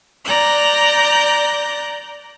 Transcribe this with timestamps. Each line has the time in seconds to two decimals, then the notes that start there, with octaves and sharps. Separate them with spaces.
0.24 D5 A#5 F#6 G6